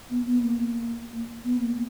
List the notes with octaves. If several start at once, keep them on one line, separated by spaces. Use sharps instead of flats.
B3
B3
A#3
B3
A#3